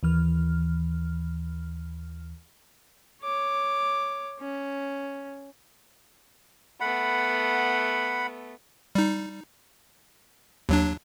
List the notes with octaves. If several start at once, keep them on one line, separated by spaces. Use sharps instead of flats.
D#2 E3 F6
C#5 D6
C#4
A3 B3 F#5 B5
G3 D#4
D#2 F#3 D4